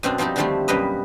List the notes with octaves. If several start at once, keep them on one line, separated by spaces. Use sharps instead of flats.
F#2 B2 C4 D4
F3 G3 C4 D#4 G4
D3 D#3 F3 G3 A3 C4
F#2 B2 G3 A#3 B4 D#5